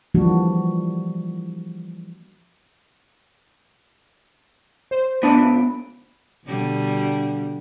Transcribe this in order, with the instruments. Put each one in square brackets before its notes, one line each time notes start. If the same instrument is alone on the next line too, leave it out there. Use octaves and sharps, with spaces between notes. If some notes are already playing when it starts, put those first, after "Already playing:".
[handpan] E3 F3 G3 A#3 D4 F#4
[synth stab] C5
[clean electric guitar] C#2 G#2 B3 [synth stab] D4 D7
[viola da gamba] B2 D3 G3